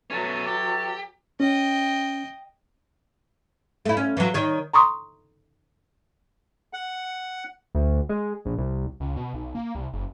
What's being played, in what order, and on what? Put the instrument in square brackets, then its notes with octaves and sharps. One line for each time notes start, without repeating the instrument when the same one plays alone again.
[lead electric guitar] B2 C#4 [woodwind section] E3 F#4 A4 [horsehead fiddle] F#3
[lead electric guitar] G4
[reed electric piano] C#4 [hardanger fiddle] D#5 G5
[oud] A3 E4
C#4
E3 F#3
D#3 C#5
[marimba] A#5 C6 C#6 D#6
[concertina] F#5
[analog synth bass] D2
G#3
A#1
C2
[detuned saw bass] C#2
B2
B1
A#3
C2
F#1